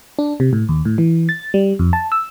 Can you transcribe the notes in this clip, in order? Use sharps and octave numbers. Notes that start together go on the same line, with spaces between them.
D4
C3
A2
D#2
A2
E3
A6
G3
F2
A5
E6